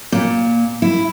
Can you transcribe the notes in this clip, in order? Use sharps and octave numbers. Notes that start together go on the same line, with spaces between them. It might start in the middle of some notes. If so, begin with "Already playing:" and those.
A#2
E4